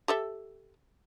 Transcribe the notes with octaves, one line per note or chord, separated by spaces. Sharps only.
G4 A4 E5